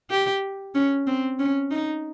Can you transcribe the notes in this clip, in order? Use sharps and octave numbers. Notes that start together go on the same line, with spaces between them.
G4
C#4
C4
C#4
D#4